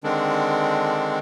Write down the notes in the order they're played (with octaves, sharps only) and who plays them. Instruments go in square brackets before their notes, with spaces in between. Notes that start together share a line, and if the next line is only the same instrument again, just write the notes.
[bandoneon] D3 D#3 G#3 C4 D4